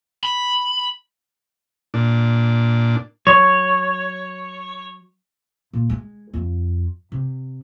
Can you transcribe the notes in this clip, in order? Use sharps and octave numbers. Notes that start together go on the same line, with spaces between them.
B5
A#2 D4
F#3 C#5
A#2
G#3
F2
C3